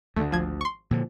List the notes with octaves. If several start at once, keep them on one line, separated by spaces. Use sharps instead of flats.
D2 D3 A3
G#1 F3 G#6
C6 C#6
A#2 D3 F3